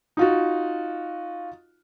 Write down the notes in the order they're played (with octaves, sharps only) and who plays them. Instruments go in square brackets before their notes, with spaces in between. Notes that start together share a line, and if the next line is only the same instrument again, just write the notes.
[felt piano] D#4 F4 F#4